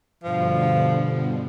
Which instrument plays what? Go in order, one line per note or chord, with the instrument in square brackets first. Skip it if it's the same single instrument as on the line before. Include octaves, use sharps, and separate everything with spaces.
[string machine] G2 B2 D3 [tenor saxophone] F3